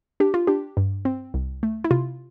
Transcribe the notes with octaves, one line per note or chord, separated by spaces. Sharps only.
D4 G4
F4
D4 G4
G2
C4
C2
A3
E4
C3 F4